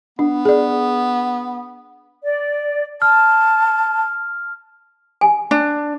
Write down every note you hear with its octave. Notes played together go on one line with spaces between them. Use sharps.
B3 D4
G#4 D5
D5
A5 F6
G#5
D4